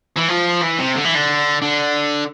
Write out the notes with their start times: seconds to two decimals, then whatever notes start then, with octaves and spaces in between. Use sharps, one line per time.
0.17 E3
0.30 F3
0.63 E3
0.79 C3
0.96 D3
1.05 E3
1.15 D3
1.62 D3